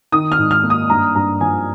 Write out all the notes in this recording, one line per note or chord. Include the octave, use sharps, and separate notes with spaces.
D#3 D#6
F6
G#2
F6
A#3
D#6
G2 A#5
G2 A#5
F3 G#5